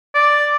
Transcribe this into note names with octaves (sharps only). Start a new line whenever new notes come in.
D5